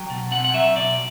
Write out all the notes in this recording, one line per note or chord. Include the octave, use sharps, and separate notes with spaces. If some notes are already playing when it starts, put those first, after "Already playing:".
Already playing: F#3 G5
B2
C4 F#5
F#5
F#3 E5
B2 D5